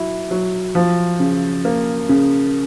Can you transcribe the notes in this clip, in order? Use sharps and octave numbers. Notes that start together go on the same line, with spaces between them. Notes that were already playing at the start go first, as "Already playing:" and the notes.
Already playing: F#3 E4
F#3
F3
C#3
A#3
C#3